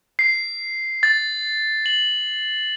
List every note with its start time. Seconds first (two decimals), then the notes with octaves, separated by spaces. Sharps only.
0.19 C7
1.03 A6
1.86 F#7